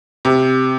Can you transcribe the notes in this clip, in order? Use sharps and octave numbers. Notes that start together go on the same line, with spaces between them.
C3